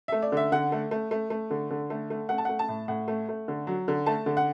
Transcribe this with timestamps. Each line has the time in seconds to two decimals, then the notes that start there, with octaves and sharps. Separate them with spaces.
0.08 A3 E5
0.22 D5
0.32 D3 E5
0.52 D3 F#5
0.72 A3
0.91 A3
1.11 A3
1.30 A3
1.50 D3
1.71 D3
1.90 A3
2.10 A3
2.29 A3 F#5
2.38 A5
2.45 A3 F#5
2.59 A5
2.69 A2
2.88 A2 F#5
3.08 A3
3.29 A3
3.48 D3
3.67 F#3
3.88 D3
4.06 A3 A5
4.26 D3
4.37 F#5